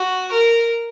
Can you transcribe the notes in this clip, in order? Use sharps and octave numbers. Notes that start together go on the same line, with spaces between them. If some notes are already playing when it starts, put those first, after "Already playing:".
Already playing: F#4
A#4